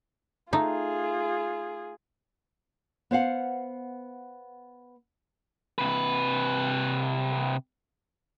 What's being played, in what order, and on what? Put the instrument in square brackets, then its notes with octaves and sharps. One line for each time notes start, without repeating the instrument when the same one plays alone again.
[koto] A3 D#4 [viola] F4 G#4
[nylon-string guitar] B3 C5 F5 F#5
[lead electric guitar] C3 B4